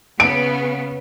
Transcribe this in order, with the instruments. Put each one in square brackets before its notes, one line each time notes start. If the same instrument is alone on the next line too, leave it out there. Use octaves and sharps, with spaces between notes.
[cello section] C#3 B3 [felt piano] D7